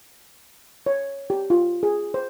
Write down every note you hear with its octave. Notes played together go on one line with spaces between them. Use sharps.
C#5
G4
F4
G#4
C5